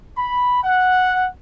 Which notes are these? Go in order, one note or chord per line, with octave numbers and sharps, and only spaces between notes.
B5
F#5